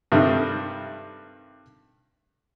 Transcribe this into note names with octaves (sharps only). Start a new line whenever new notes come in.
G2 C3 D#3 G3 A3